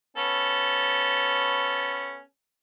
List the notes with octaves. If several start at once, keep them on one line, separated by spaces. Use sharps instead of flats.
B3 C#4 A4